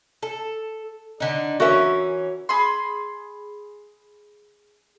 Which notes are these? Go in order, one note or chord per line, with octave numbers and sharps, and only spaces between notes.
A4
D3 D#4
E3 C#4 F#4 A#4 E5
G#4 B5 C6